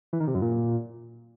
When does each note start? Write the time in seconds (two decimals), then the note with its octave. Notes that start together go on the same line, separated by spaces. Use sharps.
0.13 E3
0.20 D#3
0.27 C3
0.35 F#2
0.42 A#2